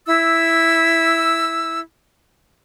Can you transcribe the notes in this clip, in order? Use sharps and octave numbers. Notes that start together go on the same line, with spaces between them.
E4 E6